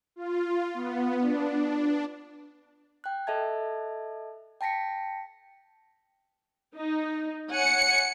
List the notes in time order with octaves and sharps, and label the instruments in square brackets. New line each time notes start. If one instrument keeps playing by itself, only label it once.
[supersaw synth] F4
B3
D4
[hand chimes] G5 F#6
A4 D#5 E5 A5 G#6
G5 A5 A#6 B6 C#7
[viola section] D#4
[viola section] C#5 F#5 G#5 [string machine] C#7